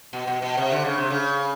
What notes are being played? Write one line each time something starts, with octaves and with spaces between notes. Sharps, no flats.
B2
B2
B2
C3
D3
C#3
C3
C#3